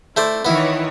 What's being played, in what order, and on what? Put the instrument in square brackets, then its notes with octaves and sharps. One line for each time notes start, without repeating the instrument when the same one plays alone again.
[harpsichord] A3 C5 D5 [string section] E4
[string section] D#3 E3 C#5 [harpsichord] B3 E4